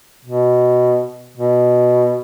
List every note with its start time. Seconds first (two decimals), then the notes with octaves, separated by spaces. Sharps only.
0.25 B2
1.37 B2